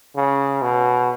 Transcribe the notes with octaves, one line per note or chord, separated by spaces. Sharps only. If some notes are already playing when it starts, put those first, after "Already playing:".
C#3
B2